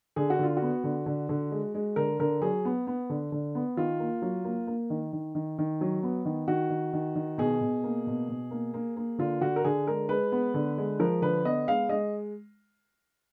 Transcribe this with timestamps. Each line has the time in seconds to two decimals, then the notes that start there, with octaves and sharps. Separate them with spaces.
0.16 D3 G#4
0.30 F#4
0.39 D3 F4
0.57 F#4
0.62 B3
0.84 D3
1.06 D3
1.29 D3
1.51 G#3
1.74 G#3
1.96 D3 A#4
2.19 D3 A#4
2.41 F#3 G#4
2.65 B3
2.87 B3
3.10 D3
3.32 D3
3.55 B3
3.77 D#3 F4
4.00 A#3
4.22 F#3
4.45 A#3
4.67 A#3
4.90 D#3
5.13 D#3
5.35 D#3
5.58 D#3
5.81 F#3
6.03 B3
6.25 D#3
6.48 D#3 F#4
6.70 D#3
6.93 D#3
7.15 D#3
7.38 B2 G#4
7.61 B2
7.84 A#3
8.07 B2
8.29 B2
8.51 A#3
8.74 A#3
8.96 A#3
9.18 D3 F4
9.41 D3 F#4
9.56 A#4
9.64 D3 G#4
9.87 G#3 A#4
10.09 G#3 B4
10.32 B3
10.54 D3
10.78 G#3
11.00 F3 A#4
11.22 D3 B4
11.45 B3 D#5
11.68 G#3 F5
11.89 G#3 D#5